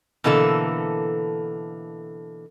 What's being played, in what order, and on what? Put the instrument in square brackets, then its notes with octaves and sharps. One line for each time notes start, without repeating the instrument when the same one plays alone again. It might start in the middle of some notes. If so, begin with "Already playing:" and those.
[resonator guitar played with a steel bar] B2 D3 E3 A#3 A4